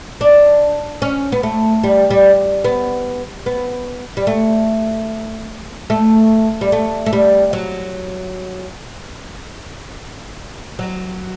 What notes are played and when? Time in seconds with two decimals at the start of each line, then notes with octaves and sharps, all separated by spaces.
0.21 D4
1.02 C#4
1.32 B3
1.43 A3
1.84 G3
2.10 G3
2.64 B3
3.46 B3
4.17 G3
4.27 A3
5.90 A3
6.61 G3
6.72 A3
7.06 A3
7.13 G3
7.53 F#3
10.79 F#3